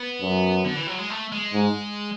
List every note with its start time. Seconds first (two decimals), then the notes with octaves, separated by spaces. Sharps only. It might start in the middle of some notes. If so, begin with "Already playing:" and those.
Already playing: B3
0.22 F#2
0.65 D3
0.76 E3
0.87 F#3
0.98 G#3
1.10 A3
1.32 G#3
1.54 G#2